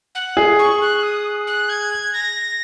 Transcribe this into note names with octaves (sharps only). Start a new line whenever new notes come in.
F#5
G#4
C#6
F#6
D#6
F#6
G#6
A#6